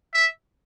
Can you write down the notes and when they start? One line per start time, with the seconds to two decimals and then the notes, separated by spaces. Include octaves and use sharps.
0.14 E5